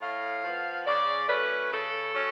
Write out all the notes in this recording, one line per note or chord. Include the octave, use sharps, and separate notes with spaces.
A2 F5
F3 B3
C#3 D5
F#3 A3 C#4 B4
C#3 A4
F#3 C#4